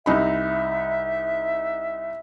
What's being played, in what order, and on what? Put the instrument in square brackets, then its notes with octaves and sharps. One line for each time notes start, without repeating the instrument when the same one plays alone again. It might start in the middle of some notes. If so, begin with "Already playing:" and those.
[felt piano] C2 D#4 B5 [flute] E5